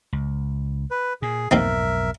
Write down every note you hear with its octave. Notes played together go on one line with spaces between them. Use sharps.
C#2
B4
A#2 G#4
B1 F2 G#2 A#3 C4 D#4 A#4 E5